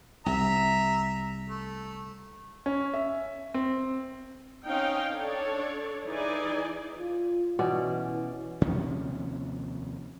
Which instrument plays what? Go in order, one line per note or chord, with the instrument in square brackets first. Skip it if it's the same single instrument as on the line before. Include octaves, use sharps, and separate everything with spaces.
[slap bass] C2 [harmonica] E5 A#5
[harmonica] A3
[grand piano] C#4
E5
C4
[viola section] C4 C#4 D#4 F5 G5
D4 A4 C#5 D5
E3 D#4 G#4 D5 G#5
[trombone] F4
[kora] B2 C#4 D5 [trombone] E3
[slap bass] D#2 C3 F3 C#4